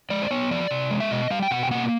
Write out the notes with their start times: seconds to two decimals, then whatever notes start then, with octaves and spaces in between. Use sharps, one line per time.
0.10 G#3 D5
0.22 C5
0.31 B3 C#5
0.51 F3 D5
0.71 C3
0.91 G#3
1.00 E5
1.11 B2 D#5
1.30 G3 F5
1.42 G5
1.51 B2 F#5
1.63 G5
1.71 A#3 F#5